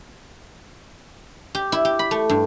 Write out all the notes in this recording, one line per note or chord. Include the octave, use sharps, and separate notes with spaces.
G4
E4
G4
B5
A3
G2